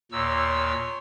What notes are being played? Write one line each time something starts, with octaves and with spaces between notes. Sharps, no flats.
D#2 A#2 C#5 C6 E6